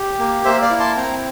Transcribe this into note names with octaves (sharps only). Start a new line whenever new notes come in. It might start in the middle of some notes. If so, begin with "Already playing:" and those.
Already playing: G4
A#3
A#3 C5 E5
D5 F5
E4
A5 C6
C4 G5 A#5